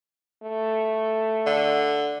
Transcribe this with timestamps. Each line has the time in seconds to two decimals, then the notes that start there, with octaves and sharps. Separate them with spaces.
0.43 A3
1.46 D3